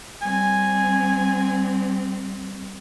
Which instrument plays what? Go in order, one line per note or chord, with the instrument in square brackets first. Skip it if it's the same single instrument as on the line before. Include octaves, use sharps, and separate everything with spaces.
[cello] G3 C4 [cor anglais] G#5